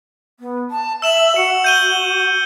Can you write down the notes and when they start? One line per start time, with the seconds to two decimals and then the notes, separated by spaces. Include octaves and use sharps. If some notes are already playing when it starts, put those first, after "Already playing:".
0.40 B3
0.71 A5
1.02 E5 E6 E7 F#7
1.36 F#4 C#7
1.64 G6 D#7 G7